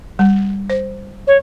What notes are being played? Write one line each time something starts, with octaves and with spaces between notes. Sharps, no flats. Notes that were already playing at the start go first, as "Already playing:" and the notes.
G3
C5
C#5